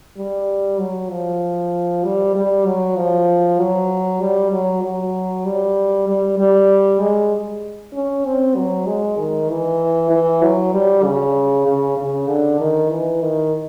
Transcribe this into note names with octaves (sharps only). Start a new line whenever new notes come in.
G3
F#3
F3
G3
G3
F#3
F3
F#3
G3
F#3
F#3
G3
G3
G3
G#3
C#4
C4
F#3
G#3
D#3
E3
E3
F#3
G3
C#3
C#3
C#3
D3
D#3
E3
D#3